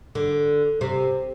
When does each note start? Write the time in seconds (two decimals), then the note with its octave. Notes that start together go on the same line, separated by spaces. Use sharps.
0.15 D3
0.81 C3